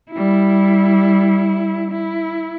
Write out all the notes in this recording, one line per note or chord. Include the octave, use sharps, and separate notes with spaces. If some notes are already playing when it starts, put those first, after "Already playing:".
G3 E4
E4